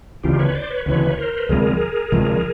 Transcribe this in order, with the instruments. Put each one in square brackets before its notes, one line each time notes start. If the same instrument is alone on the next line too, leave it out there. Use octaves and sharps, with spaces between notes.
[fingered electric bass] D2 C#3 E3 [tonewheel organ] F4 G4
[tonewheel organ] B4 C#5
C5 D5
B4 C#5
[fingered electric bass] D2 C#3 E3 [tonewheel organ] B4 C#5
[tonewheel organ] C#5
A#4 C5
B4
[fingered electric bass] D2 C3 F3 G#3 [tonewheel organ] G#4 A#4
[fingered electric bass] D2 C3 F3 G#3